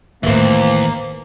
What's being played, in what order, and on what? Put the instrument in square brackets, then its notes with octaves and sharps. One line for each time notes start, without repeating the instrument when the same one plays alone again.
[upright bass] A1 A2 [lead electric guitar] D#2 [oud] E3 C4 [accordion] A#3